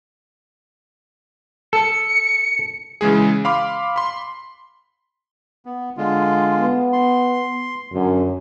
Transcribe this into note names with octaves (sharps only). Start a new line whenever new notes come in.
A4 C#7
C#3 E3 G#3 G#4
F5 B5 C6 D6
B5 C6
B3
D3 G#3 F4
B3
C6
F#2 D3